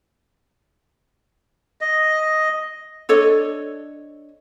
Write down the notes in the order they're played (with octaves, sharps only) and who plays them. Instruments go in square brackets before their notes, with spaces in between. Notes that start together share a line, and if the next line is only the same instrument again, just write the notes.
[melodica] D#5
[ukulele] D4 A4 C#5 D#5